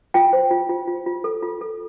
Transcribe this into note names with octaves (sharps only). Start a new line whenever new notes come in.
F4 G5
C5
F4
F4
F4
F4
A4
F4
A4